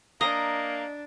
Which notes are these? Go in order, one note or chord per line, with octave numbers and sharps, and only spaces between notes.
A#3 D4 D#5 A#5